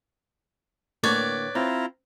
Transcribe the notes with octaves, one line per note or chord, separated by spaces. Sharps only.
A2 D3 A#3 B4 C#5 D5
C4 E4 F4 A#5